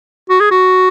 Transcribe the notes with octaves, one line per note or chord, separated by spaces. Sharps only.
F#4
G#4
F#4